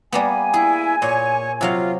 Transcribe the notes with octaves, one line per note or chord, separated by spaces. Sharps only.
G3 A#3 B3 G#5
E4 G#4
A#2 C#5
C3 F#3 F4 F5